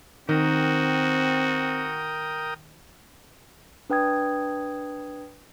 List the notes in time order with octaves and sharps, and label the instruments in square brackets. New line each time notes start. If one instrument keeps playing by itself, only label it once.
[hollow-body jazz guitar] D#3 [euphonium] C4 [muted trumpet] F#4 [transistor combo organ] A#4 G5 D#6
[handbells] D4 B4 G5 D#6 G#6